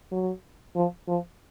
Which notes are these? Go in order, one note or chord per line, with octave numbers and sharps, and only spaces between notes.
F#3
F3
F3